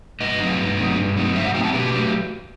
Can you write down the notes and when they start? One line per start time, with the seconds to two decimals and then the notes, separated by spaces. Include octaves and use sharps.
0.21 G2 B4 D#5
0.40 F#3 A3 C4 D#4
0.59 G2
0.77 F#3 A3 C4 D#4
0.96 G2
1.16 F#3 A3 C4 D#4
1.35 G2 C5 E5
1.44 D#5 F#5
1.54 F#3 A3 C4 D#4 E5 G5
1.64 F#5 A5
1.73 B2 G4 B4
1.93 F#3 A3